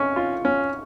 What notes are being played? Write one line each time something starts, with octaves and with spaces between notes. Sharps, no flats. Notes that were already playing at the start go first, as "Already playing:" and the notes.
Already playing: C#4 C#6
F4
C#4